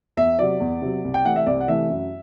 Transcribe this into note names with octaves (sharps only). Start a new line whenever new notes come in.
E2 E5
C3 F#3 D5
E2
C3 F#3
C2
G5
C3 E3 A3 F#5
E5
C2 D5
F#5
C3 E3 A3 E5
F#2